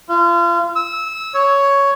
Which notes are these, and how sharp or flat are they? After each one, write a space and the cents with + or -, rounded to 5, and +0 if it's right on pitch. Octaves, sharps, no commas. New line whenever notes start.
F4 -35
E6 -20
C#5 +5